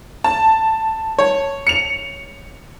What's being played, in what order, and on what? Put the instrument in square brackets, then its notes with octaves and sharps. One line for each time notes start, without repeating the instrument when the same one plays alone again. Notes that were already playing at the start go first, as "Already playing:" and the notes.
[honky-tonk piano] A5
[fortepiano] C#5
[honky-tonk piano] C#7 F7